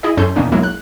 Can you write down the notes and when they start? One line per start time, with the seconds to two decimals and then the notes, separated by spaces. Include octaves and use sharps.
0.03 E4 G#4 D#5
0.17 F#2 C#4 A4 C6 G6
0.36 E2 B2 D#3 A#3 C#4 D4
0.52 B1 F#3 G#3 A#3 E4
0.63 F#6